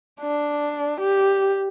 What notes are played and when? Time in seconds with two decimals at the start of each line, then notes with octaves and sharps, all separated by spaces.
0.21 D4
1.01 G4